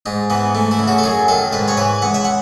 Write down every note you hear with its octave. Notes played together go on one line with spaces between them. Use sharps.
G#2 D#4
E3 B3
A3
E4
C#3
F#4
A4
F#2 G#4
D#3 A4
G#2 B4
C#5
E3 B4
C#2 F#5
E5
F#5